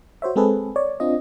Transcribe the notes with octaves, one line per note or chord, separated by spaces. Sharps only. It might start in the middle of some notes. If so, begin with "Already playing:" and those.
F#4 C5 C#5 E5
G#3 C4 G#4 A4 B4
C#5 D5
C4 D4 F4 D#5